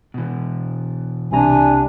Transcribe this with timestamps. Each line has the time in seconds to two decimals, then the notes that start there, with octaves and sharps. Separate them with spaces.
0.14 B2 E3
1.31 C2 C3 D4 G#5 A#5